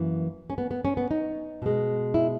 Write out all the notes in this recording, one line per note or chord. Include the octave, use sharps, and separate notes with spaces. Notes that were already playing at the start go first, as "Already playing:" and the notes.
Already playing: F#2 E3 A#3
C#4
B3
B3
C#4
B3
D#4
B2 G#3
E4